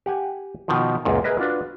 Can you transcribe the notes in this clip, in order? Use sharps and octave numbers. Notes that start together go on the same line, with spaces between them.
G4 F#5 G#5
B2 D#3 F3
C#2 F#2 A#2
G#4 A#4 B4 D#5 E5
D4 F4 F#4 B4